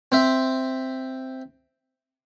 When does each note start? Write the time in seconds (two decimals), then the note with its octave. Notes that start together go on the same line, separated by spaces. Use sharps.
0.12 C4 C5 E5